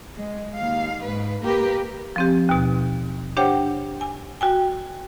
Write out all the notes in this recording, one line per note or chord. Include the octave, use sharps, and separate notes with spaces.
G#3
D#2 F5
G#2 B4
A#3 G4 A#4 B4
F3 C4 G4
D#2 B2
D4 G4 C5 C#5 F#5 G5
G#5
F#4 G5 G#5